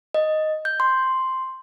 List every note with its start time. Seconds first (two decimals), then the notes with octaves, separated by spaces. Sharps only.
0.14 D#5
0.65 G6
0.80 C6